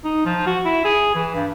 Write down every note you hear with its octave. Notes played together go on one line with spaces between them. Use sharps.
D#4
F3
F#4
E4
G#4
E3
G2